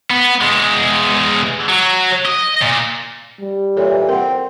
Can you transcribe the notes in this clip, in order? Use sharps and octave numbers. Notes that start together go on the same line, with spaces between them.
B3
E2 G#3
F#3
D#5
A#2
G3
A#2 E3 A4 C#5
C4 A#4 F#5